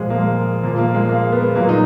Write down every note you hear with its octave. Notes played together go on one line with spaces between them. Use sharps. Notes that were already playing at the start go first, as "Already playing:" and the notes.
Already playing: A#2 F3 G#3
A#3
G#3
A#2 F3 A#3
A#3
G#3
A#3
B3
A#2 F#3 A#3
D#4